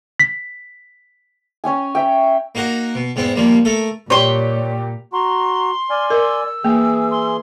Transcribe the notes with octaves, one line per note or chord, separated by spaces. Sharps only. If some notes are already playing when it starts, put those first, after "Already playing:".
B6
C#4 C#5 G5 G#5
C#5 E5 G5
A#3 D#4 F#4 A#4 F#5
B2
E2 G#2 B3 C4
D#2 F3 G3 A#3
A3 A4 A#4
A#2 G3 G4 C#5 C6
F#4 A#5 C6
D5 G#5 F6
A#4 E6
E3 A#3 G#4
C6